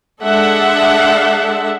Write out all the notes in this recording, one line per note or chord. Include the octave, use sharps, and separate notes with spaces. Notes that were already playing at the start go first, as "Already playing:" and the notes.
G#3 D4 A4 E5 F#5